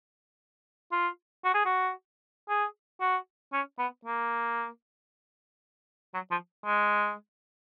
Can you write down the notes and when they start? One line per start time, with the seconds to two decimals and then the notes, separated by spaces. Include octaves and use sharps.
0.92 F4
1.44 F#4
1.54 G#4
1.65 F#4
2.49 G#4
3.01 F#4
3.53 C#4
3.79 B3
4.05 A#3
6.14 F#3
6.31 F3
6.66 G#3